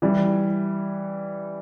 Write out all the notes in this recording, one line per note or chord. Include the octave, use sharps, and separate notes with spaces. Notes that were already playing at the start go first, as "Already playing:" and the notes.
E3 G3